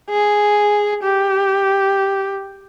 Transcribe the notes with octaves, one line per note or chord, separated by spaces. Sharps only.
G#4
G4